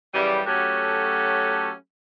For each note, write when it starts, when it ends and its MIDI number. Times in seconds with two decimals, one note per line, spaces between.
0.14 0.42 42
0.14 0.42 49
0.14 0.42 52
0.14 0.42 55
0.46 1.72 54
0.46 1.72 57
0.46 1.72 61
0.46 1.72 66
0.46 1.72 67
0.46 1.72 69